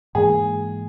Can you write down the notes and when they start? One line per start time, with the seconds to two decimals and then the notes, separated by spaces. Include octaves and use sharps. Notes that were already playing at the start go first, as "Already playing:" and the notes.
0.15 G#2 E3 A#3 G#4